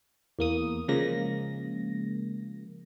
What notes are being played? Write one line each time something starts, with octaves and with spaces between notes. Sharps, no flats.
E2 A#3 D#6
C#3 F3 G#3 A#3 A#6